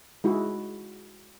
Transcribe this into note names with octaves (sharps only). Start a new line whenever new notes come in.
G#3 E4 F#4 G#4